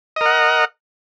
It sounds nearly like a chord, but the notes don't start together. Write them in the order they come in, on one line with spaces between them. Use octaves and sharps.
D#5 A#4 F#5